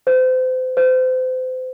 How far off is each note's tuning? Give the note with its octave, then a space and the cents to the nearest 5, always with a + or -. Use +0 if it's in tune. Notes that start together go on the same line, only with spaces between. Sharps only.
C5 -35
C5 -35